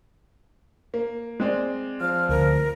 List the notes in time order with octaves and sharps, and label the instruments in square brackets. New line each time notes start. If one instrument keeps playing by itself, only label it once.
[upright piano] A#3
G#3 C4 D5
[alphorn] F3 [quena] F6
[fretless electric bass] D2 [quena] A#4